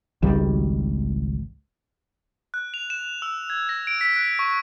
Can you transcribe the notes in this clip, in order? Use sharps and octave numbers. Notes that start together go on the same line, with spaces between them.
G#1 C#2 D#3 G3
F#6
F7
E7
E6
G#6
A#6
D7
B6
F#6
C#6